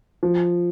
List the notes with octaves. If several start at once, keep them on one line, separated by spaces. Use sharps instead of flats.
F3